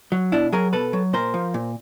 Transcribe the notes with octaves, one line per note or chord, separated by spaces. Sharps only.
F#3
B2 D4 E4
F#3 G#4 A#4
B2 A4 B4
F#3
A#2 A#4 C5
F3
A#2